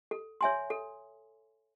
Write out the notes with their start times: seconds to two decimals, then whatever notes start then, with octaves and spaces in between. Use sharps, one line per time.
0.11 A4
0.41 C#5 E5 G#5 C6
0.70 A4